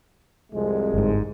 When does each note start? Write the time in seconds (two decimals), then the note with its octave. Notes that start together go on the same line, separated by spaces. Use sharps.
0.52 C2 F2 G#3
0.94 G1 G#2